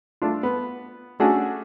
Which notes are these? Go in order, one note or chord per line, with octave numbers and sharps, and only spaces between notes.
A3 D4 F4
B3
A3 C#4 D4 F#4 G#4